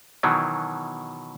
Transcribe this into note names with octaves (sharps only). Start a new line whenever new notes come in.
B2 D#3 E3 F#3